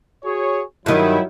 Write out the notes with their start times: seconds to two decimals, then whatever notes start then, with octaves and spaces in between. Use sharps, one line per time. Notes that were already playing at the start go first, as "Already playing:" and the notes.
0.24 F#4 G#4 C#5
0.86 G2 D#3 F#3 E4